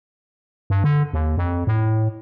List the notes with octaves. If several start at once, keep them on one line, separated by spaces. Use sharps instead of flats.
G2
D3
D#2
F2
A2